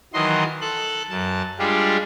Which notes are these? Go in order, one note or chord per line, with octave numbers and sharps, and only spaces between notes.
D#3 E3 F#3 D#5 C6
A4 F#6
F#2 A5
G3 G#3 D4 F4 G4